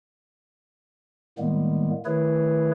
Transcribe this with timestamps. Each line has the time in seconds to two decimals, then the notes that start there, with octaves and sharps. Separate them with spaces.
1.38 A2 D#3 G3 G#3 A#3 B3
2.05 D#3 A3 E4 G#4 B4 C#5